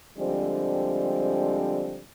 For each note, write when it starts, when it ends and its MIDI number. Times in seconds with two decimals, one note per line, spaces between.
0.18 2.02 50
0.18 2.02 53
0.18 2.02 55
0.18 2.02 56
0.18 2.02 60